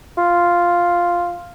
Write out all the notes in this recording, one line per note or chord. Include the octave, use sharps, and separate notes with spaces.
F4